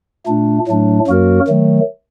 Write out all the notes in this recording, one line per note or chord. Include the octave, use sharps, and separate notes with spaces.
A#2 A3 D4
A2 F#3 A3 D4
F#2 F#3 A#3 F#4 A#4
D#3 F#3 A3